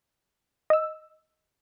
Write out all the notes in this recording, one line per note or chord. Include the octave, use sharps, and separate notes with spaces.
D#5 E6